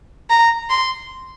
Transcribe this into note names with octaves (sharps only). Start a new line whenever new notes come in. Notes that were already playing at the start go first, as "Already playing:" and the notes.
A#5
C6